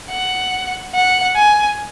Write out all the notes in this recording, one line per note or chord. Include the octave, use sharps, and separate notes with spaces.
F#5
F#5
G#5